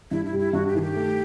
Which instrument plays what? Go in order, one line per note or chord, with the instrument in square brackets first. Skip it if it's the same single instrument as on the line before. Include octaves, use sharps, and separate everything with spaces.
[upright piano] G2 [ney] E4
[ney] E4
[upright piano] G3
[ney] E4
[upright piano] G2 [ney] F#4
[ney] G4
[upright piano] D#3 [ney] G#4
[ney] G4
[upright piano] A3